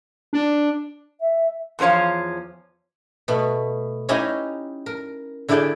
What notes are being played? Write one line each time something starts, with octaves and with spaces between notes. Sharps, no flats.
D4
E5
E2 F3 C5 C#5 F5
B2 A3 B3
C#4 D#4 E4 G4 G#5 A#5
A#4
D3 E4 G4 G#4 D5 G5